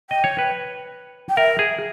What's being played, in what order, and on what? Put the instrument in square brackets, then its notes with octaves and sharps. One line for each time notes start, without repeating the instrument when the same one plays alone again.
[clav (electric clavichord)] D#5 [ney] G5
[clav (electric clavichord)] C#5
B4
[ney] G5
[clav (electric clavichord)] A#4 [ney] E5
[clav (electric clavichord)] G#4